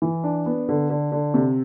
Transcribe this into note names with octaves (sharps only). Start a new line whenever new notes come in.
E3
D4
B3
D3
D3
D3
C3